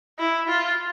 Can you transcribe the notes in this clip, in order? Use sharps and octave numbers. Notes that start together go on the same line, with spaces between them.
E4
F4